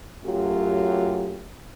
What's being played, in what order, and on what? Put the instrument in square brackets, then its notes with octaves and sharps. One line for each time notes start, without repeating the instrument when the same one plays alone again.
[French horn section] F#2 F#3 A3 F4 G4